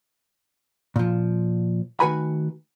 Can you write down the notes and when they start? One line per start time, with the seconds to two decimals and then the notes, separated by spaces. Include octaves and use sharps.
0.96 A#2 F3
2.00 D#3 A3 F#4 B4 G#5 B5